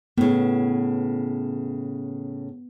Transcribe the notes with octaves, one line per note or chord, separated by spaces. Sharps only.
A2 C#3 B3